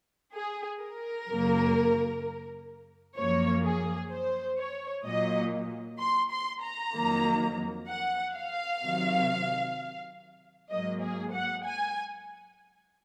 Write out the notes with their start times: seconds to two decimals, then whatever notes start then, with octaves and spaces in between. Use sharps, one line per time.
0.34 G#4
0.80 A#4
1.28 F#2 C#3 F#3 A#3
3.16 F#2 F3 A#3 C#5
3.64 G#4
4.11 C5
4.58 C#5
5.05 A#2 F#3 A#3 D#5
5.99 C6
6.31 C6
6.62 A#5
6.94 F2 D#3 F#3 A#3
7.88 F#5
8.35 F5
8.83 C3 D#3 F#3
10.70 G#2 F#3 A#3 D#5
11.02 G#4
11.33 F#5
11.65 G#5